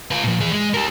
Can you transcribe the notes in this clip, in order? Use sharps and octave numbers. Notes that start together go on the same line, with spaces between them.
F4 B4
A#2 F3
E3 G#4
G#3
G4 A#4